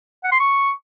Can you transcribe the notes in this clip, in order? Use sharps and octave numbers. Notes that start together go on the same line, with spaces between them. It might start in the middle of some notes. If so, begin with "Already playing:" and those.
F#5
C6
C#6